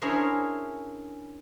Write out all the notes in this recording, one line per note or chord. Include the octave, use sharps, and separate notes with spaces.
C#4 D4 E4 G#4 A#4 C5